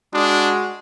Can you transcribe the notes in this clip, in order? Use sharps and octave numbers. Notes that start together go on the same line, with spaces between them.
G#3 D4 F#4